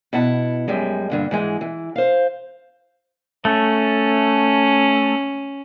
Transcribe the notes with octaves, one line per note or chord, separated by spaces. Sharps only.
B2 E4 F#5 A5
F#2 G3 G#3
G2 D3 A#3
G#2 E3 G#3
E3
C5 F5
A3 C#4